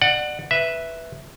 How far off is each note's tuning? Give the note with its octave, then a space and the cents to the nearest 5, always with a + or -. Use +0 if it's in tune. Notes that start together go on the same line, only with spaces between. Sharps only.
D5 +30 F#5 +0
B4 +0 E5 +0